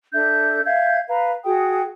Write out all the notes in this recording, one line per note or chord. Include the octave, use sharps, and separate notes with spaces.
D4 A4 E5 G6
E5 F5 G6 G#6
B4 F5 A#5
F#4 G#4 G5 D#6